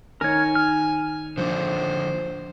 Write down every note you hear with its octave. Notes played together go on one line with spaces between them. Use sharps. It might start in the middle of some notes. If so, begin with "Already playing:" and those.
D#3 D#4 A#4 C#5 G#5
F6
D3 F3 D4 C5